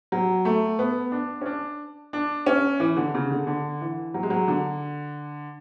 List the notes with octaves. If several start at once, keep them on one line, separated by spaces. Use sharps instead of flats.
F#3
A3
B3
D4
C#4
D4
D4
C#4
E3
D3
C#3
D3
D3
E3
F#3
G#3
F#3
D3